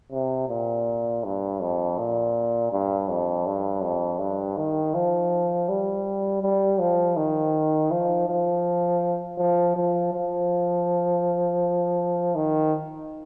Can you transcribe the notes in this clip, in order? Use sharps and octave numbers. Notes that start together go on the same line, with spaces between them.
C3
A#2
G2
F2
A#2
G2
F2
G2
F2
G2
D#3
F3
G3
G3
F3
D#3
F3
F3
F3
F3
F3
D#3